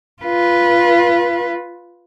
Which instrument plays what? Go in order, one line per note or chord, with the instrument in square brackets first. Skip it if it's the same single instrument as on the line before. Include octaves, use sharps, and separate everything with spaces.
[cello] F4 B4